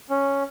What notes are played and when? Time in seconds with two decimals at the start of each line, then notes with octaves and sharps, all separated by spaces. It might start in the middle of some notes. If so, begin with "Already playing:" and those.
0.10 C#4